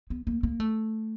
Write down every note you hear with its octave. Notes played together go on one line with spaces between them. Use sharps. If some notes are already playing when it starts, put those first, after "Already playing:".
B3
A#3
A#3
A3